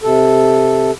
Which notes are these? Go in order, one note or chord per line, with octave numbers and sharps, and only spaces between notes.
C3 A4